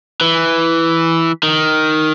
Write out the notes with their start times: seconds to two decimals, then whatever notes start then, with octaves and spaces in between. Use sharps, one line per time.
0.21 E3
1.43 D#3